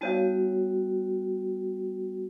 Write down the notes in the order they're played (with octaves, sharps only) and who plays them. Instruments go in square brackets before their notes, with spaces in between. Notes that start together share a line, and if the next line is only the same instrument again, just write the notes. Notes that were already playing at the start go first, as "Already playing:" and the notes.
[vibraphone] G3 B3 F#4 [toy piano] D#4 C#5 F5